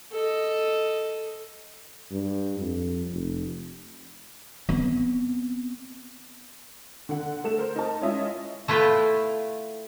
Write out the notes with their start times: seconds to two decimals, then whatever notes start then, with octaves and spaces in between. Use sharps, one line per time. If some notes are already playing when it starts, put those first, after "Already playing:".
0.12 A4 D#5
2.11 G2
2.59 F2
3.13 F1
4.69 B3 C4
7.09 D3 F#5
7.44 A3 A4 E7
7.58 A#4 C5
7.76 D#4 A#4 A5
8.01 G#3 C#4 E4 F4 D#5 E5
8.68 A3 E4 F4 B4 G5